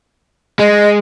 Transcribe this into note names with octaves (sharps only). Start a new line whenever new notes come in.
G#3 D#5